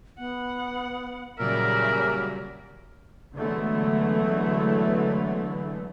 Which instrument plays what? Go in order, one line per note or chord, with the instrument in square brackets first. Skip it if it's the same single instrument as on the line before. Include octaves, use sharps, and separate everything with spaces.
[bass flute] B3 [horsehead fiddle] F#5
[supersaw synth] A#2 F#3 G3 [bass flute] C#3 [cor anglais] A#4 [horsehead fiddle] D5 E5
[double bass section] D3 E3 F#3 G#3 A3 B3